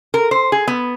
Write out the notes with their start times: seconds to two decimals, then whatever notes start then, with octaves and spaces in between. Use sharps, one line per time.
0.14 A#4
0.31 C5
0.52 G#4
0.67 B3